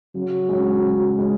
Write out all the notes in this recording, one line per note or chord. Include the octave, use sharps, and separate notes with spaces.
C#3 F#3
G#3 C#4
C#3
G#3 C#4